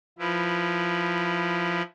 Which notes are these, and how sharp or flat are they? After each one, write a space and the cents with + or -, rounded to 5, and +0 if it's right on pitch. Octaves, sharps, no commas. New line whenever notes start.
F3 +0 E4 +15 B4 +0